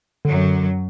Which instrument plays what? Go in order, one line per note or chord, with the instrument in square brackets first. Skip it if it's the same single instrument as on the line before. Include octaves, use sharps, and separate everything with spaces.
[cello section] F#2 F#3 [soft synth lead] D3